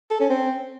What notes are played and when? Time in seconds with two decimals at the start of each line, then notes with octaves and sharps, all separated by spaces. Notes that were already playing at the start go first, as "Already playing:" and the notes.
0.11 A4
0.20 C#4
0.30 C4